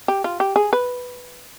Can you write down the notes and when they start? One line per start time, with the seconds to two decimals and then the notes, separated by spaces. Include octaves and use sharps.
0.08 G4
0.24 F4
0.40 G4
0.56 G#4
0.73 B4